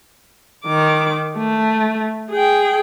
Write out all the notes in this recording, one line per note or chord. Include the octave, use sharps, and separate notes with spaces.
D#3 D6
A3
G#4 G5